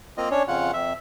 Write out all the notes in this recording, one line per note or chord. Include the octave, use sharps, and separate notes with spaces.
A#3 C4 F4 D#5
C#4 D4 C#5
F2 C#3 F4 F#5
F2 E5